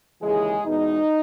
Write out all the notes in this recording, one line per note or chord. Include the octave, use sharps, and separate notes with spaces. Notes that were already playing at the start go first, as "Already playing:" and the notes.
D#2 C#3 E3 G#3 G#4
E2 B2 G#3 B3 D#4